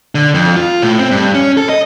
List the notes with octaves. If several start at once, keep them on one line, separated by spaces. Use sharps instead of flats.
D3
F2
F4
A2
C4
G2
C#4
A4
D#5